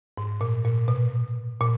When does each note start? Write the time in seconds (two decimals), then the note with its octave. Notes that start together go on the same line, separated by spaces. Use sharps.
0.18 G#2
0.41 A#2
0.65 A#2
0.88 B2
1.61 A#2